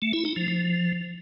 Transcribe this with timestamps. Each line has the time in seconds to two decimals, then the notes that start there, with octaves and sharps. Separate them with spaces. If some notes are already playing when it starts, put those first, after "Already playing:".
0.02 A3
0.13 E4
0.25 D#4
0.36 F3
0.48 F3